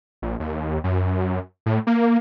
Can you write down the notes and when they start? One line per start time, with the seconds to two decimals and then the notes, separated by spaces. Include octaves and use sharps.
0.22 A#1
0.40 D#2
0.84 F#2
1.66 A2
1.87 A#3